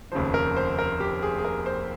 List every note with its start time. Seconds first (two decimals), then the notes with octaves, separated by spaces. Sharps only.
0.12 F1 D#2 C#3 F3 C5
0.34 A#4
0.57 C5
0.79 A#4
1.00 G4
1.22 G#4
1.38 G#4
1.45 A#4
1.66 C5